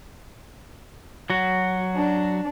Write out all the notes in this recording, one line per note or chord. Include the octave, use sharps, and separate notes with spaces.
F#3 F#4
D4